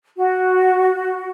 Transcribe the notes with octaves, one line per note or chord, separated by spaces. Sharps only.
F#4